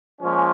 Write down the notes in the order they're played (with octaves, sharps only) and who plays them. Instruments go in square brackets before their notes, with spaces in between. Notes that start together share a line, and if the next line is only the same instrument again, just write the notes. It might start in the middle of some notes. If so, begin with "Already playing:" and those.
[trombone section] A#2 F3 G#3 C#4